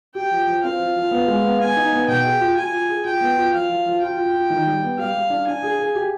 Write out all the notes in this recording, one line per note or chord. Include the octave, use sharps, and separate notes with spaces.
G4 G5
F3
F3
C4 F5
F3
F3
B3
G#3
B3
B3 G#5
D#4
B3
B2 G5
G#4
F4
F4 G#5
F4
G#4
F4 G5
B3
F4
F3 F5
F3
F3
F4 G5
F4
F4
D#3
G3
B3
G3 F5
G3
D4
D4 G#5
G#4
G#4
G4